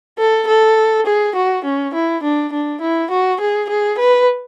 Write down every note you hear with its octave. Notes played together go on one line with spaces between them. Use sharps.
A4
A4
G#4
F#4
C#4
E4
D4
D4
E4
F#4
G#4
G#4
B4